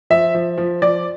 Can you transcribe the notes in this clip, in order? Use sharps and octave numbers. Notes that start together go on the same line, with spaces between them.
F3 E5
F3
F3
F3 D5